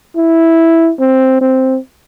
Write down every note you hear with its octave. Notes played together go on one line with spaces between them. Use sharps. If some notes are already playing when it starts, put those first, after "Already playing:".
E4
C4
C4